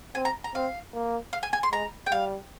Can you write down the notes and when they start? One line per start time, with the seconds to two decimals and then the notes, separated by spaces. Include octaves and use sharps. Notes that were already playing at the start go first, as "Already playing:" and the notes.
0.15 C4 G#5
0.25 A#5
0.44 A#5
0.55 C4 F5
0.94 A#3
1.33 F5
1.43 G#5
1.53 G#5
1.63 C6
1.72 G#3 A#5
2.06 G5
2.12 G3 F5